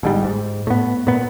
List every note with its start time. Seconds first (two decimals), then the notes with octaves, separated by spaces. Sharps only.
0.03 G1 G#2 G3
0.24 G#2
0.67 A2 B3
1.07 A#2 B3